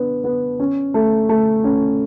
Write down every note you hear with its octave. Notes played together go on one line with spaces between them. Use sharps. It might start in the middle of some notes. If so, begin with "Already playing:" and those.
Already playing: B3 D4
B3
C#4
A3
A3
C#4